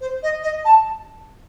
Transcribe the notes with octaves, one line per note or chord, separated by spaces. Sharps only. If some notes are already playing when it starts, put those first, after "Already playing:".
C5
D#5
D#5
A5